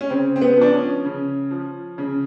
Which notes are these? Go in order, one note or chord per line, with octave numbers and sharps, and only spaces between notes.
C#4
C#3 C4
C4
B3
F3 D4
C#4
C#3
F3
C#3